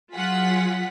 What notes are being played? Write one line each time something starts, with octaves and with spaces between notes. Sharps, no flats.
F#3 F4 G#4 F#5 B6